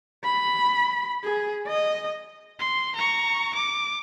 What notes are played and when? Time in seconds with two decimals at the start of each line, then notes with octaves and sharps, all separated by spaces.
0.24 B5
1.24 G#4
1.67 D#5
2.59 C6
2.95 A#5 C#6
3.55 D6